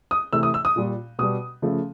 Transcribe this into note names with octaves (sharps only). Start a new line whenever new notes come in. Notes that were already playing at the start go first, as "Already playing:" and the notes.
D#6
C3 E3 A3 E6
D#6
E6
D#6
A#2 G3
B2 G3 D#6
C#3 F3 A3